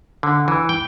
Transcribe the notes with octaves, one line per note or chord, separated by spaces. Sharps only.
D3
E3
G5